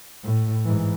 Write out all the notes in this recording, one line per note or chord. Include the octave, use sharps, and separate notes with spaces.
A2
G#2 E3